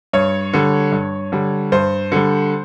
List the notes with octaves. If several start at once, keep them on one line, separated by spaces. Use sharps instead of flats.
G2 C#5
D3 G3
G2
D3 G3
G2 C5
D3 G3